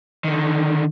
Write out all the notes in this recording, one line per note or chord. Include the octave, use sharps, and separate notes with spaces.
D3 D#3